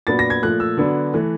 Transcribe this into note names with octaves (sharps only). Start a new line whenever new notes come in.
A#2 F#3 B3 D4 A6
A#6
G#6
A#2 F3 A3 F#6
E6
D3 F#3 B3 D4
E3 A3